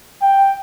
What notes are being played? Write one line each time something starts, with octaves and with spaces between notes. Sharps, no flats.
G5